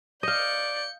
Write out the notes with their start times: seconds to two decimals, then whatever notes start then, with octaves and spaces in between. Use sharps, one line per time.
0.23 D5 D#5 F5 G6 C#7